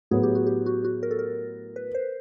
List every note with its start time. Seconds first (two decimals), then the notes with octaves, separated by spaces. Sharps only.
0.11 A2 F#3 B3 G#4
0.23 G4
0.35 F#4
0.47 G4
0.66 F#4
0.84 F#4
1.03 A#4
1.11 A4
1.19 A#4
1.76 B4
1.95 C5